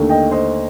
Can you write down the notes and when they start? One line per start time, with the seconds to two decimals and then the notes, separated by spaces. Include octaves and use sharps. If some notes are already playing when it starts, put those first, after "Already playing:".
Already playing: D#2 D3 A3 D4
0.09 D#5 G5
0.31 C5 D#5